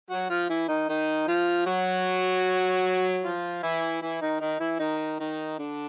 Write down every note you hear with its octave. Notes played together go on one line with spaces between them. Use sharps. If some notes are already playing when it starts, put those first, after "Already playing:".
F#3 F#4
F3 F4
E3 E4
D#3 D#4
D#3 D#4
F3 F4
F#3 F#4
F3 F4
E3 E4
E3 E4
D#3 D#4
D#3 D#4
E3 E4
D#3 D#4
D#3 D#4
D3 D4